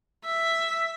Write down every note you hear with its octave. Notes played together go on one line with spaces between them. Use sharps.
E5